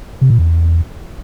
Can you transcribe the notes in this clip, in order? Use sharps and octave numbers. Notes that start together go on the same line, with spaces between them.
C3
A#2
E2